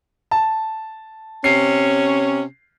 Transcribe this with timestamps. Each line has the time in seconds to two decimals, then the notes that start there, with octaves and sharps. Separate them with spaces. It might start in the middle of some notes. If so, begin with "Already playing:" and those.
0.31 A5
1.44 C3 C#4 C7